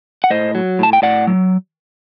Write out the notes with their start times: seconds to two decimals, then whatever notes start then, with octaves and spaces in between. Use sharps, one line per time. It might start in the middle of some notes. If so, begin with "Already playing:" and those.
0.24 F#5
0.30 A2 C5 D#5
0.55 F#3
0.79 A2 A5
0.93 G5
1.02 A2 D5 F#5
1.27 F#3